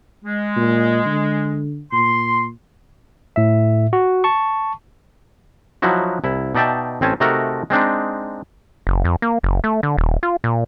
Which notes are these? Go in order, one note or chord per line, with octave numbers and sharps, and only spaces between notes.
G#3
A#2
D3
A#2 C6
A2 E5
F#4
A5 C#6
F3 F#3 D#4 E4 F#4
C2 E4
B2 D#4 D5 E5 G5 A5
A1 C4 C#4 G#5 A5
C3 A3 D#4 F#4 A4 A#4
G#3 C4 D4 D#4
F#1
F2
A#3
F#1
A3
D3
D#1
F4
A#2